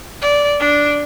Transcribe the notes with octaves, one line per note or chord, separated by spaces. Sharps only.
D5
D4